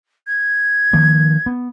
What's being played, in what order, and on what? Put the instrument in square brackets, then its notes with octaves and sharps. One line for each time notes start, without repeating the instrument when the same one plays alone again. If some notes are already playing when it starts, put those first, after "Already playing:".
[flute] G#6
[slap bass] D#3 F3 A#3
B3